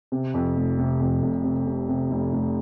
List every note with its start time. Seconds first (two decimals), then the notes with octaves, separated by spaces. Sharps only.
0.12 C3
0.34 F2
0.56 F1
0.79 C3
1.00 F2
1.22 F1
1.44 C3
1.67 C3
1.89 C3
2.11 F1
2.33 F1